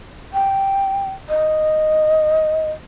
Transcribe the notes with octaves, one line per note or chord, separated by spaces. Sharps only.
G5
D#5